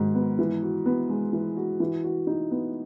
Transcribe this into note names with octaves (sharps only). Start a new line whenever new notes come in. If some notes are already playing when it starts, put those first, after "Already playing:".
Already playing: G#2 D#3 F#3
B3
E3
F#4
B3
G#3
E3
F#4
E3
F#4
D#4
B3